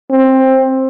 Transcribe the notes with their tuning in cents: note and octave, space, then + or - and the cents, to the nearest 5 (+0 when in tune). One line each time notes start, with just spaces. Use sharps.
C4 +15